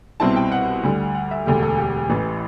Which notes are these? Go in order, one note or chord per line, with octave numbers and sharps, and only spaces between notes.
C2 B2 G3 C4 E4 A5
G5
F#5
D2 D3 G3
F#5
E5
E1 D2 D3 A3 G4
A4
G4
A1 A2 E3